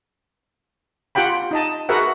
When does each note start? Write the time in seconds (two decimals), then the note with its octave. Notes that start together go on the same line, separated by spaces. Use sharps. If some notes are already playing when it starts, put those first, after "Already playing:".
1.15 F4 G4 F#5 G5 B5
1.51 D#4 D#5 A5
1.89 F#4 G#4 A#4 B4 E5 F#5